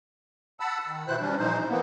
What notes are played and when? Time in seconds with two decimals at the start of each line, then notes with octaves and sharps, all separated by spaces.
0.60 F#5 A5 B5 E6
0.86 D#3
1.07 B2 E3 E4 C5 F#6
1.20 G3 C#4 D4
1.39 A#2 E3 F3 D#4 C5
1.69 E3 A#3 B3